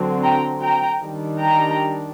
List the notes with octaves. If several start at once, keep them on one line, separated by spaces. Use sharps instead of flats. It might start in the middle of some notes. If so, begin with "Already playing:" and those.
Already playing: D3 F#3 C4
G5 A#5
G5 A#5
D#3 G3 D4
G5 A#5